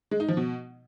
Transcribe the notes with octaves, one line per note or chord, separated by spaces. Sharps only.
G#3
D#4
F3
B2